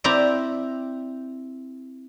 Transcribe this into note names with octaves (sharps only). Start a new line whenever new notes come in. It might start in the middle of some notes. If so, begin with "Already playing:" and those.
C4 E4 G4 D5 A#5